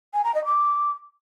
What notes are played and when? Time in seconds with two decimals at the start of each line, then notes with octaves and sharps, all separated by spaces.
0.14 G#5
0.24 A#5
0.35 D#5
0.45 D6